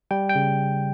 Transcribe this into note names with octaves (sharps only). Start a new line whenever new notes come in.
G3 G5
G5
C#3